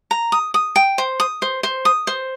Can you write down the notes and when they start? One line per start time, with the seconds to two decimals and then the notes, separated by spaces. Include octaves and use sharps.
0.11 A#5
0.32 D#6
0.54 D#6
0.76 G5
0.98 C5
1.20 D#6
1.42 C5
1.63 C5
1.85 D#6
2.07 C5